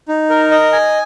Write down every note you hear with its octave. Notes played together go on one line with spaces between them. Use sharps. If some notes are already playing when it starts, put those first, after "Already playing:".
D#4
A#4
D#5
G#5